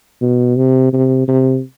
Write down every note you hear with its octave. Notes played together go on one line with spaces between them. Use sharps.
B2
C3
C3
C3